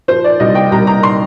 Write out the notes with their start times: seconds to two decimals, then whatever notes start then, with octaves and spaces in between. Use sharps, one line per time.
0.08 F3 C5
0.24 D5
0.40 C2 D#5
0.55 G5
0.72 C2 A#5
0.87 A#5
1.03 C6